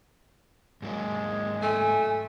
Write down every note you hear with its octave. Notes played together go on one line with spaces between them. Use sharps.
G#2 F#3 G#3 A#3
A3 G#5